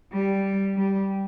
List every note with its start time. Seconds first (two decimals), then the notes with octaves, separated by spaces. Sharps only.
0.13 G3
0.77 G3